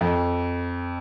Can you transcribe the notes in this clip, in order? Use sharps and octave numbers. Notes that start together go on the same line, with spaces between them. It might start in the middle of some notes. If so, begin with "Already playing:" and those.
F2